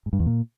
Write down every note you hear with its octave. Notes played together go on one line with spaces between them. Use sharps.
G#2
G2
E2
A#2